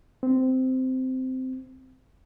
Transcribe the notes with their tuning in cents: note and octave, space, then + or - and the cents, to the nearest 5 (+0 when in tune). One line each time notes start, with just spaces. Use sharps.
C4 -15